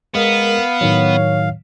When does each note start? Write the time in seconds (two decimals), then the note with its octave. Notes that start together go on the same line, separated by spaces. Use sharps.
0.15 G#3 B3 A#4 F5
0.81 A2 D#3 F#3 C#5